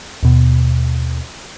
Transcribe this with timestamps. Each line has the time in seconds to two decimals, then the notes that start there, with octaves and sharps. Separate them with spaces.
0.23 D#2 B2